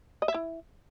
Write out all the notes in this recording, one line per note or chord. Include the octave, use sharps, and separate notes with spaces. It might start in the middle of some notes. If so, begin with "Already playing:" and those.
D#5
E5
E4